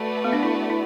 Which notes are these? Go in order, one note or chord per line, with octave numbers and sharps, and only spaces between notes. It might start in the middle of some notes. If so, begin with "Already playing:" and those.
Already playing: A3 F#4 B4 D5
B3
D4
E4
E4